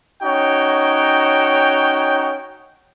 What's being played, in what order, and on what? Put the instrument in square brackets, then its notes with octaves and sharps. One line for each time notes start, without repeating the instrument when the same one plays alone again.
[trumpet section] C#4 D#4 F#4 C#5 G5